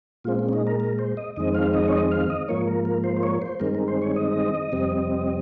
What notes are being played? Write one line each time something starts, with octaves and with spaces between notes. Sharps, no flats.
A#2 G#3 C4 F4
C4
C#4
D#4
A#4
A#4
C5
D#5
F2 D#3 G#3 C4 D#5
F5
D#5
C#5
D#5
F5
D#5
G#2 F3 A#3 C#5
A#4
A#4
C5
C5
C#5
C5
G2 D#3 G#3 C4 A#4
A#4
C5
C#5
D#5
F2 C3 G3 C4